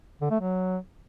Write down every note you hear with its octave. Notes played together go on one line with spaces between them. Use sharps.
D3
A3
F#3